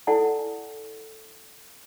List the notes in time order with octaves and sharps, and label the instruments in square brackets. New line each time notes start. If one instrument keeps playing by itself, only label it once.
[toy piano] E4 A4 D5 F#5 G#5